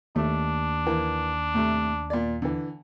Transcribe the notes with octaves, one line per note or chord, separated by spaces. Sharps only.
D#2 A3 D4
E3 A#3
A2 C3 A3
A#2 D5
D3 E3